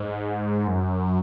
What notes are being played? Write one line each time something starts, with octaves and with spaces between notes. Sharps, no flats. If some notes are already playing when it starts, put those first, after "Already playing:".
Already playing: G#2
F#2